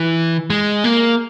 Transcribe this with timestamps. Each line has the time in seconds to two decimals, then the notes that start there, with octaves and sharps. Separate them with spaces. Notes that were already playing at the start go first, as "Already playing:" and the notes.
Already playing: E3
0.50 G#3
0.84 A#3